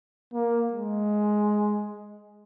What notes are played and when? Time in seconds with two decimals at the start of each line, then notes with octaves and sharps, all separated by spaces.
0.33 A#3
0.73 G#3